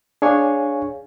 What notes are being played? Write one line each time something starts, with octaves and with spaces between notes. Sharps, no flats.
D4 G#4 C#5 F5 G#5 C#6